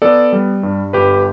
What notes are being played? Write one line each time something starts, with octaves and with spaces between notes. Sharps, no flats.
B3 A4 D5
G3
G2
G1 G4 B4